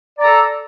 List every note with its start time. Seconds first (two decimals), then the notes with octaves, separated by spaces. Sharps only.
0.19 D5
0.22 A#5
0.25 A4